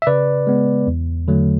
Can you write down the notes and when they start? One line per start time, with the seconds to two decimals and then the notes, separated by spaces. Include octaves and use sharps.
0.02 E5
0.07 C#3 B4 D5
0.47 G#3 B3
0.87 E2
1.28 D3 F#3 A3